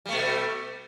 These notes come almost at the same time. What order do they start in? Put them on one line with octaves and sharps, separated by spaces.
G3 A3 B2